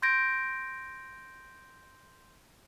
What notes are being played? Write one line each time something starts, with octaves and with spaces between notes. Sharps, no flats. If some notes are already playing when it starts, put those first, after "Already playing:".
C6 G6 G#6 A#6 D7